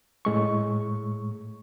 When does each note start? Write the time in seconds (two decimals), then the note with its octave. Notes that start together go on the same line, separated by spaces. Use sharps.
0.25 A2 G#3 C#6